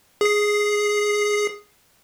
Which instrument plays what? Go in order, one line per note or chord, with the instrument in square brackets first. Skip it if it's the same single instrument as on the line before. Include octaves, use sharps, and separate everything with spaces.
[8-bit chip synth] G#4 C7